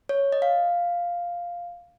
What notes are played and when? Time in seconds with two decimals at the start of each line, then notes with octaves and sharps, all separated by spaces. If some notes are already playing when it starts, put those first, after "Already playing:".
0.09 C#5
0.32 D#5
0.42 F5